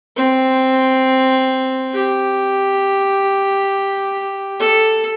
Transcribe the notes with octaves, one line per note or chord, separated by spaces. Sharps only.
C4
G4
A4